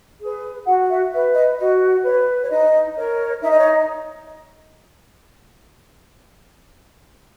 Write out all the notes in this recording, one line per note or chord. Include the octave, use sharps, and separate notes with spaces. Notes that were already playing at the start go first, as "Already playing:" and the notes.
G#4 B4
F#4 F#5
E5
B4 E5
D#5
F#4 D#5
B4 C#5
C#5
D#4 D#5
A#4 C#5
D#4 E5
D#5
C#5